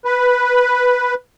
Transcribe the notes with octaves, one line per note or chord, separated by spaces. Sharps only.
B4